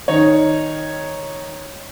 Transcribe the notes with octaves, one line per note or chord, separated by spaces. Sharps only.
D#3 D#4 C#5